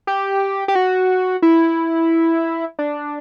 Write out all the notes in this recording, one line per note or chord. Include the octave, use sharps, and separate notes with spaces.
G4
G4
F#4
E4
D4